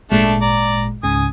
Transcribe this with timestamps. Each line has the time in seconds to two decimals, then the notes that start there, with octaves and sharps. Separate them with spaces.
0.11 G#1 A#2 G#3 A3 D4
0.42 D5 A#5
1.03 C#2 G#2 C#3 G#5 D#6